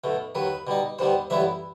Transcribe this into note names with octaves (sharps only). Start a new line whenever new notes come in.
B1 B2 A3
D#2 D#3 F#3 B4
B2 G3 D#4
D#2 D#3 G3 B3 C5
A1 G2 F#3 B3 E4 E5